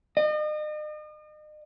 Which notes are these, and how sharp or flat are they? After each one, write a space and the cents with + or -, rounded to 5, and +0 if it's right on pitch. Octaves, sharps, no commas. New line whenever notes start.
D#5 -40